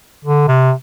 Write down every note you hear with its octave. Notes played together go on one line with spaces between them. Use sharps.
D3
C3